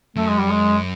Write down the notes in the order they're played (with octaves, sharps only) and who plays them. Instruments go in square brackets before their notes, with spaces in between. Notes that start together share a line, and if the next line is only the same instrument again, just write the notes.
[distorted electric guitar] F#2 [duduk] A3
[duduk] G#3
G3
G#3